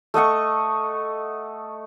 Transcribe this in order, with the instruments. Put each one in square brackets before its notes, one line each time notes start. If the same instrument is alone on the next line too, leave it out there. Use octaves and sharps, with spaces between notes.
[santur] A3 D#5 F#5 C#6